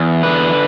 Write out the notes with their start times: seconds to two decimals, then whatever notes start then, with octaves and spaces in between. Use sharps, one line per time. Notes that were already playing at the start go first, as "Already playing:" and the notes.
Already playing: E2
0.23 D3 B4